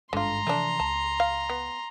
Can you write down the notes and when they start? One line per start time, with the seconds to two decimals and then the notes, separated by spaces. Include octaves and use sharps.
0.13 G#1 G2 D3 G#3 F4 A#5 C6
0.47 C3 E3 F3 A3 D4
0.80 C#2 A5
1.20 F5
1.49 B3